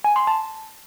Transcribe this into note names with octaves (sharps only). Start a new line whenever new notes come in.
G#5
C6
A5